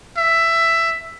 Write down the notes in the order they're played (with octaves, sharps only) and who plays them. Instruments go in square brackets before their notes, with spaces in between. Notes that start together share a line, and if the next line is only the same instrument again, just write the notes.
[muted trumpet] E5